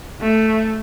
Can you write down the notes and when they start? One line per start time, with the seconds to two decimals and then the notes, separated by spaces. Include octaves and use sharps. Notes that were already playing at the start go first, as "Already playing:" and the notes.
0.21 A3